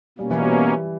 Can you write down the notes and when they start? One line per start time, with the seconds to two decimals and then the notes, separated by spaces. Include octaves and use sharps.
0.18 B2 G3 A#3 C#4
0.31 E3
0.41 G3
0.52 G3